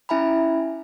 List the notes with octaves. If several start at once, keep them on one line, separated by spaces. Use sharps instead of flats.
C#4 E4 E5 G#5 A#5 B5